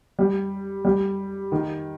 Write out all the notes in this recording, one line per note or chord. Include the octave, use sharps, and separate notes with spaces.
G3
G3
D#3